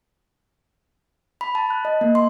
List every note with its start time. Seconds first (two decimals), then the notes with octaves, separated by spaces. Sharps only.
1.41 B5
1.55 A5
1.70 F#6
1.85 D#5
2.01 A#3
2.15 C6